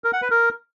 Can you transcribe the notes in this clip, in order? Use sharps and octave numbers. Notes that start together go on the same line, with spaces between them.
A#4
F#5
B4
A#4